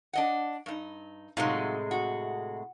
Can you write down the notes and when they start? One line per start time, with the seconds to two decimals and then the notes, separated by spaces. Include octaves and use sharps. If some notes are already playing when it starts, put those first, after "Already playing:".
0.13 D4 D#5 F#5
0.66 G2 D#4
1.37 A2 C3 F#3 G#3 D#4 F4
1.91 F#4